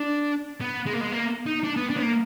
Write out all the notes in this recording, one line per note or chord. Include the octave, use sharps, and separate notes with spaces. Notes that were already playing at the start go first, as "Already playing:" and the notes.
Already playing: D4
B3
G#3
A#3
G#3
A#3
D#4
D4
B3
D4
B3
A#3